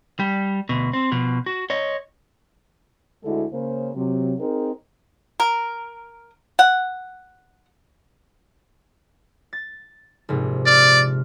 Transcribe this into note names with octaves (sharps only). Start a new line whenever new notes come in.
G3
D2 B2
C4
B2 F3
F#4
C#5 D#5
D2 D3 G#3 E4 F#4 A4
C#3 A#3 C5
C3 F#3
C4 D#4 G#4 A#4
A#4
F#5
A6
A#1 G#2 C3
D5 F6